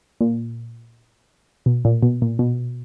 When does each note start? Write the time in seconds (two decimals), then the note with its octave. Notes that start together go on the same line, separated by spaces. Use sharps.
0.21 A#2
1.66 B2
1.85 A#2
2.03 B2
2.22 A#2
2.39 B2